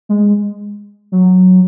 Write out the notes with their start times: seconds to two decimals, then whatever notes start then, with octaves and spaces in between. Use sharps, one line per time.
0.09 G#3
1.12 F#3